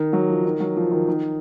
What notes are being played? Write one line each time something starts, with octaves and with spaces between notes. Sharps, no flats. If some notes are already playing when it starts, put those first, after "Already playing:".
Already playing: D#3
F#3
F3
D#3
F#3
F3
D#3
D#3